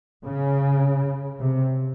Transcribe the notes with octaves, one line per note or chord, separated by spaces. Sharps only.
C#3
C3